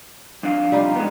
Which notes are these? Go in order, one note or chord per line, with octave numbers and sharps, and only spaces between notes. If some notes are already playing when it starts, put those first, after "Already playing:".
F2 D4 F5
G3 D#4 F4
G#3 B3